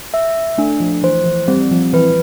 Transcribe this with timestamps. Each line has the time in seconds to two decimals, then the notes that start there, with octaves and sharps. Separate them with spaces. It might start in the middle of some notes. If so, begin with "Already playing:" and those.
0.14 E5
0.58 A3 D4
0.80 F3
1.03 E3 C5
1.22 F3
1.25 E3
1.48 G3 C4
1.71 F3
1.93 E3 B4